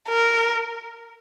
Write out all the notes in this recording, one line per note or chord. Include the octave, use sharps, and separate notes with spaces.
A#4